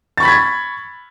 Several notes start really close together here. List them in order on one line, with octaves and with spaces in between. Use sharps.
A6 C#6 B5 B6 G#6